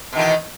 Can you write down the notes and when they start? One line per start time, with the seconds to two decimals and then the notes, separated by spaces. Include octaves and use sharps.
0.13 B2
0.16 D#3
0.19 E3